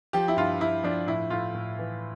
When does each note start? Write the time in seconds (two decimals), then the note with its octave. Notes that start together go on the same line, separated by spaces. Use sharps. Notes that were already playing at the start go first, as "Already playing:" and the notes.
0.13 F3 G4
0.28 E4
0.37 G2 F4
0.60 G2 E4
0.84 F3 D4
1.07 A2 E4
1.30 A2 F4
1.54 A2
1.78 E3